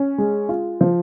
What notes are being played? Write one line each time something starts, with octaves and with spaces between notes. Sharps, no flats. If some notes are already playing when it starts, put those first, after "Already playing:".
Already playing: C#4
G#3
F4
F3